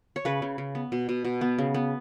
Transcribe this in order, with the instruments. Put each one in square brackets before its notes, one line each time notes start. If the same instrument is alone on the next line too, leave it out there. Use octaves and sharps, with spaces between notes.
[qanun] C#5
C#3 B4
C#3
C#3
B3
B2
B2
B2
B3
C#3
B3